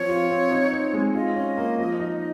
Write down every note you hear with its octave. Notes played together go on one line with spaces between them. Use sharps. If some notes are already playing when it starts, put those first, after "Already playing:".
Already playing: F3 C4 C#5
F4
C4
D#4
C4
G#3
F4 D#5
C#4
A#3
F3
D#4